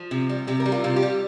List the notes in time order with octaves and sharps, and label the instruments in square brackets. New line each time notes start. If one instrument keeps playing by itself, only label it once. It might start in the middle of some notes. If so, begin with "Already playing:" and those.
Already playing: [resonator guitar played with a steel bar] F3
C3
G3
C3 G4
A#4
G3
F4
C3 F4
G4
G3